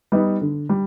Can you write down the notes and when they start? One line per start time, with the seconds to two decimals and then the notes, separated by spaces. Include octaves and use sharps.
0.12 G3 B3 D#4
0.41 D3
0.69 G3